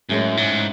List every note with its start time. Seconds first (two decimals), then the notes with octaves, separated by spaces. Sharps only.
0.09 F#2 A2 G#3 C#4
0.37 G#2